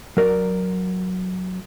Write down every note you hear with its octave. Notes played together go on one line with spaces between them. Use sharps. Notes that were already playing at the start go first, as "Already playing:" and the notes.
F#3 A#4 D5